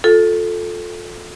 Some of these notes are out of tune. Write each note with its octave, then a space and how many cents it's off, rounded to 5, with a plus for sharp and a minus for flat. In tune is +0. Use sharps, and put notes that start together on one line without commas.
F4 +30 A4 +0